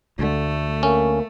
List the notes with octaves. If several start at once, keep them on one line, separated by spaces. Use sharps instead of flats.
D2 D3 A3
A#3 C#4